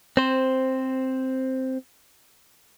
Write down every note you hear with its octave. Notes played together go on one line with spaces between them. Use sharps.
C4 C5